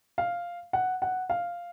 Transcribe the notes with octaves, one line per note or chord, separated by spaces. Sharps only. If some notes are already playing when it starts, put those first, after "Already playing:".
F5
F#5
F#5
F5